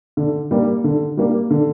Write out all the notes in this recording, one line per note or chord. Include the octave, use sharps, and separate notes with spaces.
D3
G3 A#3
D3
G3 A#3
D3